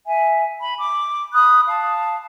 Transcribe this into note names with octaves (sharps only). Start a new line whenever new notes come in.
E5 G#5
B5
D6
B5 D#6 F#6
F5 A5